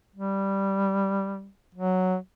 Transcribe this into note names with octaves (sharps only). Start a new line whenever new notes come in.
G3
F#3